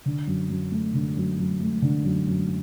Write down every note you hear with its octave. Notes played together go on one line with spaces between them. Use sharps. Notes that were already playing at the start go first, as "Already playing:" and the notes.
D3
F#2
F#2
A3
D3
F#2
F#2
A3
D3
F#2
F#2